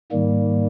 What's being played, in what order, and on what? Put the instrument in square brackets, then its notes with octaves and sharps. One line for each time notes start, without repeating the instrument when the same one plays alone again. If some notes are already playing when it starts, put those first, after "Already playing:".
[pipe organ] G#2 D#3 G3 A#3